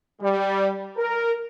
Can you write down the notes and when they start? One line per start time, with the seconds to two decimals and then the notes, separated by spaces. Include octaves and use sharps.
0.21 G3
0.97 A#4